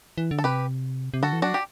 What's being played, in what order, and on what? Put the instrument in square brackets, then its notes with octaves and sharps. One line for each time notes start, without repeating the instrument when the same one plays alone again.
[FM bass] E3
D3
[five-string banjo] A4
[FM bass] C3 [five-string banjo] G4 B4
[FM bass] C3
[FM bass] D3 [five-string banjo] F#4 A4
[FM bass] E3
[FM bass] F#3 [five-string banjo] D4 F#4
[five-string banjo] G4